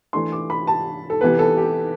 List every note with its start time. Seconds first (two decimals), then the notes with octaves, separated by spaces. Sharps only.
0.13 E3 A3 D4 C6
0.32 D6
0.50 B5
0.67 A5
1.10 A4
1.21 C3 E3 B3 B4
1.39 A4
1.57 G4